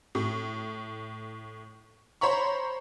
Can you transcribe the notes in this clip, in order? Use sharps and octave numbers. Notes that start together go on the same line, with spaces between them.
A2
C5 C#5 A#5 B5 C#6